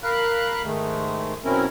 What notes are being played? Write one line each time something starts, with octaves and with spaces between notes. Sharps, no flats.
A#4 F5 B5 F#6
G#2 D#3 G#3 A3
B2 F#3 C4 C#4 E4 A#4